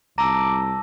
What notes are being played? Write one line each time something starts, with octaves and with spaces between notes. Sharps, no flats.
C2 A5 A#5 D6 E6 A#6